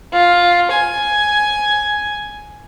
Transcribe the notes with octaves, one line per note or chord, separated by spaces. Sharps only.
F4
G#5